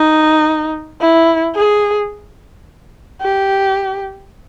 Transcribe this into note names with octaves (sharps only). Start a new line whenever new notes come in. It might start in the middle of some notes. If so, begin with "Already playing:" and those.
Already playing: D#4
E4
G#4
G4